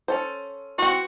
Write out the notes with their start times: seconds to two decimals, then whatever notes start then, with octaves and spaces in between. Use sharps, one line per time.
0.08 C#4 A4 C5
0.78 E3 C4 F#4